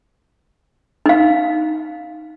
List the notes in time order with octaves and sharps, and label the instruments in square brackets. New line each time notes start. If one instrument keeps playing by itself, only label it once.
[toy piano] D#4 F5